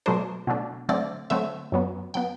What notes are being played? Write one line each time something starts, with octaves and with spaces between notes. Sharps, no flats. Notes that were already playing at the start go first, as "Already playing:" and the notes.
B2 F#3 A3 D4 C5
B2 F#3 A3 D4
D3 F#3 A3 C4 D5
D3 F#3 A3 C4 E5
F#2 F#3 B3
F#3 B3 G5